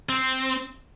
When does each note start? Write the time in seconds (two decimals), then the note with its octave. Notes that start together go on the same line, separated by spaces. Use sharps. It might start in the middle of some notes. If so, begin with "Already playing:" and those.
0.09 C4